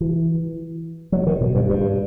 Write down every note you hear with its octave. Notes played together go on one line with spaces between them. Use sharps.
E3
F#3
D#3
B2
G2
G2